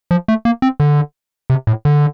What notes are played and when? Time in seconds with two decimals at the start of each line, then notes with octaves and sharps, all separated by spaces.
0.11 F3
0.28 A3
0.45 A#3
0.62 C4
0.80 D3
1.50 C3
1.67 A2
1.85 D3